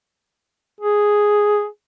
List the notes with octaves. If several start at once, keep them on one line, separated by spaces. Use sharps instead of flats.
G#4